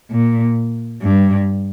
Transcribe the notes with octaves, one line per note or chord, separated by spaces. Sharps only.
A#2
G2